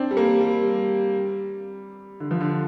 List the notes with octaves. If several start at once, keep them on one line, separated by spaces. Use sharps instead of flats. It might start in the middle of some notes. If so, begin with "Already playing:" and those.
Already playing: C4 D4
G3
A#3
G3
D3
F3
D3